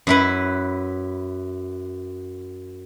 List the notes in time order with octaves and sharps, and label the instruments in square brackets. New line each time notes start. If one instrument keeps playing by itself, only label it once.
[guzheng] F#2 E4 B4